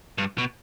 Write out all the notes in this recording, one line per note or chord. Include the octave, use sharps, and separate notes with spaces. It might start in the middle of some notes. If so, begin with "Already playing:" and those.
G2
B2